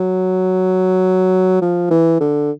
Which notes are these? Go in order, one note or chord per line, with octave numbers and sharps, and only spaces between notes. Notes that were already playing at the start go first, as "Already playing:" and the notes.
Already playing: F#3
F3
E3
D3